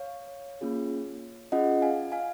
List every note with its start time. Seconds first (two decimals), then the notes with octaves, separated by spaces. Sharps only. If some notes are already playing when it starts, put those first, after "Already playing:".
Already playing: C#5 F5
0.61 A#3 C#4 F4 G#4
1.52 C#4 F4 G#4 D#5 F#5
1.82 F5 G#5
2.12 F5 G#5